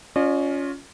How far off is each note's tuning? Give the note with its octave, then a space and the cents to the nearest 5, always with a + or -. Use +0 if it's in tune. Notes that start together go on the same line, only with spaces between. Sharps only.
C#4 +20 F4 +20 D#5 -40